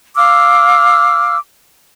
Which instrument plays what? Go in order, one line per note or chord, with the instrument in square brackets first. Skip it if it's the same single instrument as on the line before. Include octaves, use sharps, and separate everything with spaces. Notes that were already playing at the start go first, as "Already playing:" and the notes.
[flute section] F5 D6 E6 F6